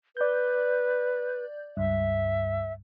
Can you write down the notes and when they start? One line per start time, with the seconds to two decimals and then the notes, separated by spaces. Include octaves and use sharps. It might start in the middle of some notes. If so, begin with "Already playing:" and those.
0.17 B4 D5 G6
1.77 C#2 G2 E5